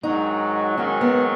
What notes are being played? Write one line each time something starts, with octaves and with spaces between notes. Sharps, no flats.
G#2 D#3 F#3 D#4
G#2 D#3 F#3 C#4
B3